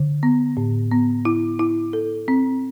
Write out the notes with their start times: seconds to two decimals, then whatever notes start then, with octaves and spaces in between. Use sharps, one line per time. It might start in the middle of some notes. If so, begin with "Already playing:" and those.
Already playing: D3
0.23 B3
0.57 A2
0.91 B3
1.25 E4
1.59 E4
1.93 A4
2.28 C4